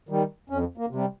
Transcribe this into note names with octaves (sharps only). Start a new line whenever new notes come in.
D#3 G3
F2 C#4
A#3
C3 G3